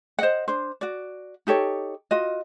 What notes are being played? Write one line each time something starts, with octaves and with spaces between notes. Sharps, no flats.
C5 D#5 F#5
D4 C5
F#4 D5
D#4 G4 A4 C#5
F4 F#4 D#5